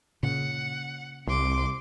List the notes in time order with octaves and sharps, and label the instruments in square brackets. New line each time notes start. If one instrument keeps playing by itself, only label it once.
[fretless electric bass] A#2 C#3 [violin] F#5
[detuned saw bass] C2 [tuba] C3 [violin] C6 D6